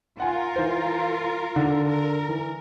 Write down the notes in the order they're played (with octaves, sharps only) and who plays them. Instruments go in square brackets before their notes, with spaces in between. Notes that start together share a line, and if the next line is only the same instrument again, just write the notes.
[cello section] F4 A#4 [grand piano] F#5 G#5
[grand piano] E3 C5
D3
[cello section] A#4
[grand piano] E3